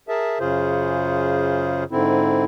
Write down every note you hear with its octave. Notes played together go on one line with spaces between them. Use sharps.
G#4 A#4 E5 A5
F#2 C#3 F4 G#4 C5
G#2 D3 C4 E4